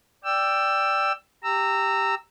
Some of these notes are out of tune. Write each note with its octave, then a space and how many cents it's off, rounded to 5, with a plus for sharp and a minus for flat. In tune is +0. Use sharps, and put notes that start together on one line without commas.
D5 +0 G5 +0 E6 +15
G4 +0 A#5 -20 E6 +0